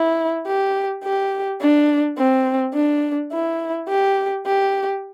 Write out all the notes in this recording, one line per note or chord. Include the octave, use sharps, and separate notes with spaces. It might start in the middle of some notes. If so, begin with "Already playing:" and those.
Already playing: E4
G4
G4
D4
C4
D4
E4
G4
G4